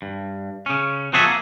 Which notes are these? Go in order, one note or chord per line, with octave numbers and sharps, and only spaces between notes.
G2
C#3 C#4
F3 C4 F#4 G#4 A4 E5
A#3